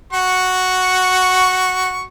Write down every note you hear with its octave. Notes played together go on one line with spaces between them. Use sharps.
F#4 C#6